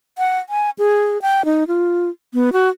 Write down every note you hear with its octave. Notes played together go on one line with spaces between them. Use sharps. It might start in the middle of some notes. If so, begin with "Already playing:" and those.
F#5
G#5
G#4
G5
D#4
F4
B3
F#4